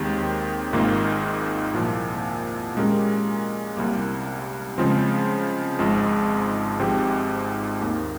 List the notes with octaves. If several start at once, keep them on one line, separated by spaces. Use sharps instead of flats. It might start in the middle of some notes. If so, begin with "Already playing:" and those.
Already playing: D#2 D#3 G#3 C4 G4
G#1 G#2 D#3 A#3 F4
C2 A#2 F3
A#2 G#3 C#4 G4 A#4
C2 C3 G3 A#3
C#3 F3 G#3 C4 F4
G#1 G#2 F3 G#3
G#1 G#2 F3 C4 G4
D#2 D#3 A#3